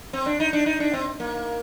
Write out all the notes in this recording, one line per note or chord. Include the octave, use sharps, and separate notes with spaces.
C4
D4
D#4
D4
D#4
D4
C4
A#3